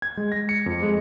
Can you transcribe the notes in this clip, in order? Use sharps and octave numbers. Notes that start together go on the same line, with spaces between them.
G#6
G#3
A#6
C#7
F2
G#3